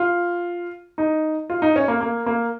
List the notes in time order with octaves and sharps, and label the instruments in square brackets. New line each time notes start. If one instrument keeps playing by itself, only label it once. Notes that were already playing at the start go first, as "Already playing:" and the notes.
Already playing: [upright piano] F4
D#4
F4
D#4
C#4
A#3
A#3
A#3